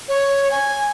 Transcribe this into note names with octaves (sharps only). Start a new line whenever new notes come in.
C#5
G#5